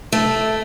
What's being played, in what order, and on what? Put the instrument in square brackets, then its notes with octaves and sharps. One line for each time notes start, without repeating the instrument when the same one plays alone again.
[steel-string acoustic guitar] A3